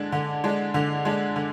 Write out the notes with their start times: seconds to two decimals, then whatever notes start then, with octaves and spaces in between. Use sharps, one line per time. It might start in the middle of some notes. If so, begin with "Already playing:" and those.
Already playing: D3 G#3 D4
0.12 D3
0.44 G#3 D4
0.74 D3
1.05 G#3 D4
1.36 D3